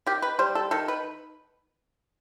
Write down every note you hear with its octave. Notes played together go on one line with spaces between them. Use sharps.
D#3 G4
B4
G3 C5
A4
D#3 A4
B4